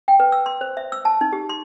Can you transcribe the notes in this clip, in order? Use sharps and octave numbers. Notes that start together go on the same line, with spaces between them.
G5
B4
E6
C6
C5
E5
E6
A5
D#4
G4
C6